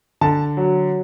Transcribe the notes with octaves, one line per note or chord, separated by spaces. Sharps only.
D3 A5
F#3